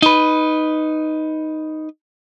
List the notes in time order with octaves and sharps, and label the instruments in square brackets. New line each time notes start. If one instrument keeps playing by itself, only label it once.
[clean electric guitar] D#4 B4